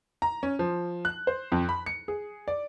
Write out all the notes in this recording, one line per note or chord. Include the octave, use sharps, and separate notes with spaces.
A#5
C#4
F3
F#6
C5
F2
B5
C#7
G#4
D5